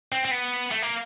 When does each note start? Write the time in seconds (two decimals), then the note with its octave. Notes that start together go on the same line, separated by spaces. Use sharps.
0.12 C4
0.25 C4
0.31 B3
0.71 A3
0.82 A#3